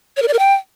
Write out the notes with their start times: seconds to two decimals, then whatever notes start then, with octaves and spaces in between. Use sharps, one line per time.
0.17 C#5
0.22 A#4
0.28 D5
0.33 A#4
0.39 G5